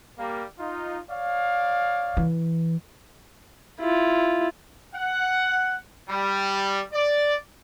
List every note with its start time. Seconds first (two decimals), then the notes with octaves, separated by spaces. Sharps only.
0.19 G3 A#3
0.59 D#4 F4
1.11 C#5 D5 F5
2.17 E3
3.80 E4 F4
4.95 F#5
6.09 G3
6.93 D5